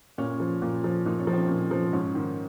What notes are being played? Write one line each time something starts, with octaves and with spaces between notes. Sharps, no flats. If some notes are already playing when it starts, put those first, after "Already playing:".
A#2 C#4
F3
A#2
F3
A#2 D#4
C#4
F3
C4
A#2 C#4
F3
G#2 C#4
D#3